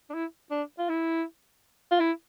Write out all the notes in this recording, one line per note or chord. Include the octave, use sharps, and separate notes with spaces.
D4
E4
D4
F4
E4
F4
E4